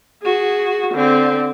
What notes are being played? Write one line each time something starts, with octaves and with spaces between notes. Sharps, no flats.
F#4 G#4
D3 C4